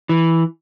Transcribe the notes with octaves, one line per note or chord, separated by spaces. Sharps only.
E3